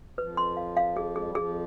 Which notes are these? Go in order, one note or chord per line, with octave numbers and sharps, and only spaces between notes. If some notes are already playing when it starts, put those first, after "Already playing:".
F2 F3 B4
C6
F5
F5
G#4
G#3 G#4
G3
F2 F3 G#4